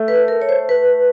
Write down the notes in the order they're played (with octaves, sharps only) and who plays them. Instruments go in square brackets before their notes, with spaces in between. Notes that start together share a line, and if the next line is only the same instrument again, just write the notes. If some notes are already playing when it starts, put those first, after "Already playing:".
Already playing: [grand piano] A3
[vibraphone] B4
A#4
C#5
C5
B4